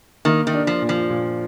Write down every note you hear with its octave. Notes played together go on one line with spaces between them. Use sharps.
D#3 A#3
D#3
D4
F3
A#2
F3
A#2